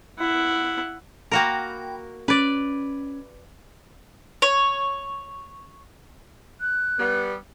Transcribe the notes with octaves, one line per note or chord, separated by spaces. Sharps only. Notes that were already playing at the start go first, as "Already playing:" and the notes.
E4 F#5
A#3 F#4 A#4 G5 B5
C#4 B4 D5
C#5
F#6
G3 B3